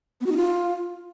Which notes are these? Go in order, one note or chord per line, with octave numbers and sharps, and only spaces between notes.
B3
F#4
D#4
F4